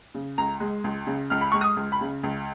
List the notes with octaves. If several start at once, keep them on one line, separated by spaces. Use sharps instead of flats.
C#3
C#2 A#5
G#3
C#2
C#3
C#2 F6
B5
G#3 C#6
D#6
C#2
B5
C#3
C#2